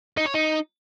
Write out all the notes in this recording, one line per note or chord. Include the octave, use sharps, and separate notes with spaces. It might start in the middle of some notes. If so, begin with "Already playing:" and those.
D#4
C#5
D#4